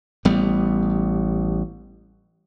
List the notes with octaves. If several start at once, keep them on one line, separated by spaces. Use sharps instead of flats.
A1 G3 B3